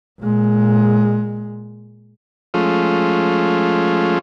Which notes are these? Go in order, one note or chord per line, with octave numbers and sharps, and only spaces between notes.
A#2 G#3
F3 G#3 A3 C#4 F4